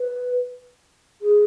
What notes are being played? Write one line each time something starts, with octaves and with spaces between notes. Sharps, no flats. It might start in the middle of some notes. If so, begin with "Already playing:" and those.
Already playing: B4
G#4